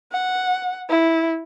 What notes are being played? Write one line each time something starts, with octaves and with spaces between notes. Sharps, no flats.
F#5
E4